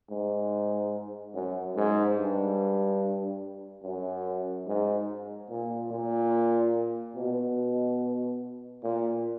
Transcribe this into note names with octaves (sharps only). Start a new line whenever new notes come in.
G#2
F#2
G#2
G2
F#2
G#2
A#2
A#2
B2
A#2